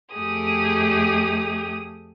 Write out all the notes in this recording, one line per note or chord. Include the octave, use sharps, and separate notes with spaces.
F2 A3 G4 G#4 D#6